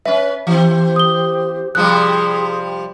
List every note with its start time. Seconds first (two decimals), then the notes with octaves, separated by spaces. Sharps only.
0.05 C#4 B4 E5
0.47 E3 C4 G4 C5
0.96 D#6 G7
1.75 C3 F3 G3 G#4 C6 D#6 F#6